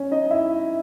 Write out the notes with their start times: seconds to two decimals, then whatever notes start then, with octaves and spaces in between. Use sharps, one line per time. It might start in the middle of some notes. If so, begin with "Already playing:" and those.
Already playing: C#4 C#5
0.11 D#4 D#5
0.31 E4 E5